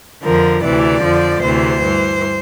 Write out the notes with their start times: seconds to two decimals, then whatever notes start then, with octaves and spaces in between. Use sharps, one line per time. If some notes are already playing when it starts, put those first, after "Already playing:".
0.23 F2 D3 F3 A#4
0.63 D2 C3 E3 D5
1.03 F2 D3 F3
1.42 D2 C3 E3 C5
1.82 G2 E3